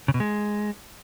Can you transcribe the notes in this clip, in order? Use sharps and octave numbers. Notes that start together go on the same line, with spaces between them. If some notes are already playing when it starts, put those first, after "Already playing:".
C#3
B2
G#3